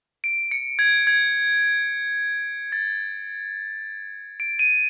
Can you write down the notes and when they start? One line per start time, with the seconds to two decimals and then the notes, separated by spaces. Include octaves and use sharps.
0.24 D7
0.51 C#7
0.79 G#6
1.07 G#6
2.72 A6
4.40 D7
4.59 D#7